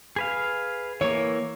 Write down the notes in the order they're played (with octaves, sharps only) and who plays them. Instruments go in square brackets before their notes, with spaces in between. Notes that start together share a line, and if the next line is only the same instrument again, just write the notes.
[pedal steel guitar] G#4 B4 F5
[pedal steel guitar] E3 A#3 [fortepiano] C#5